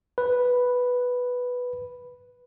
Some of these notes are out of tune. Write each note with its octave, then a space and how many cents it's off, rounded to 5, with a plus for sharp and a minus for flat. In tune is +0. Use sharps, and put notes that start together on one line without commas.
B4 +0